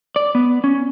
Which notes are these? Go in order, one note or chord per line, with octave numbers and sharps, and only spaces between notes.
D5
B3
C#4